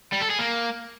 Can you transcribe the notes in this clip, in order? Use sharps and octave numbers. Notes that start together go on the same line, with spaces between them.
G3
A4
G#4
A#3